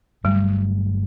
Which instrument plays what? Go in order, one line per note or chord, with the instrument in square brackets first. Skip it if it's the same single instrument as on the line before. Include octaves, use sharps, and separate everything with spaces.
[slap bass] G1 G2 F#3 A3 [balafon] G3